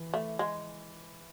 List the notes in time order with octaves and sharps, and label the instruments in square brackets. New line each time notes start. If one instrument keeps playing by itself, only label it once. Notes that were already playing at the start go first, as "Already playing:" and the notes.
Already playing: [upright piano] E3
[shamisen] A3
G#3